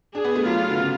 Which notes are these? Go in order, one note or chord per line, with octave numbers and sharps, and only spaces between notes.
D4 G#4
B3
A3
F#3 F4
D3
C#3